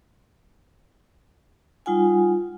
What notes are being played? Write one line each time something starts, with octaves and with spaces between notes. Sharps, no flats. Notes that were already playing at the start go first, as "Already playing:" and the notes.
G3 D#4 F4 F#5 G#5